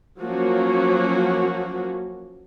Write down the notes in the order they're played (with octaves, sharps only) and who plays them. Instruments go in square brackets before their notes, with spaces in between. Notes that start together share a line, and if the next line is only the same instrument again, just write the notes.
[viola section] F3 F#3 A#3 C#4 F#4